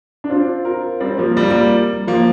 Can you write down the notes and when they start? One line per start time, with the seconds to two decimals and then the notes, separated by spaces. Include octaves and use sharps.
0.24 D4
0.30 C4 F4
0.65 F4 A#4
1.00 G3 C4
1.18 F3 A#3
1.37 G3
1.43 A#3
1.51 G3
2.07 F3 A#3